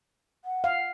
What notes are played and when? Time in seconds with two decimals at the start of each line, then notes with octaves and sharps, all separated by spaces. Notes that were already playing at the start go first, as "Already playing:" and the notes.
0.45 F#5
0.64 F5